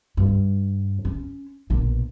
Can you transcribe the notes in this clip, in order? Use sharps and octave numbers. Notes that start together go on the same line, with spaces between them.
G2
C#4
A#1 B2